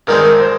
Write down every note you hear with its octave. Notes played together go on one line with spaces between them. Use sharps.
G2 D#3 G#3 C4 A#4
C5